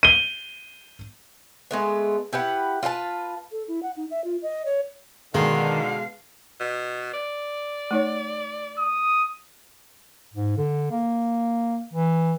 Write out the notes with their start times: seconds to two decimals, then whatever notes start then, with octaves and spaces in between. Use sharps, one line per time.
0.03 D#7 G7
1.71 G#3 A3 B3
2.33 E4 G4 B4 F#5
2.83 F4 B4 C5 A5
3.52 A4
3.68 E4
3.83 F#5
3.97 D#4
4.11 E5
4.24 F4
4.42 D#5
4.66 C#5
5.34 B2 D3 D#3 G#3 F5
6.60 B2
7.14 D5
7.91 A3 D#4 C#5
8.78 D#6
10.33 G#2
10.57 D3
10.91 A#3
11.93 E3